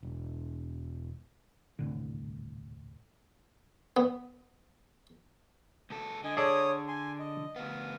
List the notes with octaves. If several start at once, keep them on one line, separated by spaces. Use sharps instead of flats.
E1
D#1 C2 A2 D3
B3
C#2 A4
D3 D#5 G#5
G#4 A4 C#5 D5 D#6
G#5 C6
D#5
D2 B3 F5